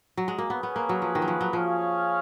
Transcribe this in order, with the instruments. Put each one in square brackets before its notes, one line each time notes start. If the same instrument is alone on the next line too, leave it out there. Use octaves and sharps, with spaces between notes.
[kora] F#3
G#3
A#3
[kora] B3 [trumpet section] C#4 G#4 B4
[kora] B3
A#3
F#3
F3
D#3
F#3
F3
F#3
[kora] F3 [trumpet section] C#4 G#4 C#5 F5